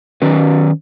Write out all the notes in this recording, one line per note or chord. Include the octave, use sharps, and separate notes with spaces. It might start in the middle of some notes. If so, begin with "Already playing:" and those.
D#3 F#3 C#4 B4